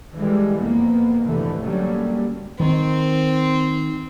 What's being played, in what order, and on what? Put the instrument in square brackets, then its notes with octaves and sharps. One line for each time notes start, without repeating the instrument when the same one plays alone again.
[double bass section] D3 E3 G3 G#3
F2 A#3 B3
F1 G#2 B2 D3 E3 A3
D3 F#3 G3 A3 A#3 C#4
[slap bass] D#3 [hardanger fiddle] C4